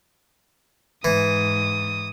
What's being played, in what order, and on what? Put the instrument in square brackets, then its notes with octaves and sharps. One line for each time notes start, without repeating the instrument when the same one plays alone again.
[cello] G#2 [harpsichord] E3 [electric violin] D#6